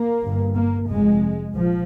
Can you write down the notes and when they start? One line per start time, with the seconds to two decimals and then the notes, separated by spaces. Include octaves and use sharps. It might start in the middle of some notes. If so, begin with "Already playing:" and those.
Already playing: A#3
0.23 G1 G2
0.56 A#3
0.89 F1 F2 C3 G#3
1.54 A#1 F3